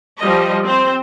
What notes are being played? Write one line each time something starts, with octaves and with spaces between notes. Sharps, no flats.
F3 G3 D#5
C4 C5